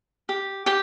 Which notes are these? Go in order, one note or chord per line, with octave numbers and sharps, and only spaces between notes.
G4
G4 G5